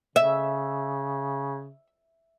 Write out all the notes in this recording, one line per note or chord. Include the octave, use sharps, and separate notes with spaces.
C#3 E5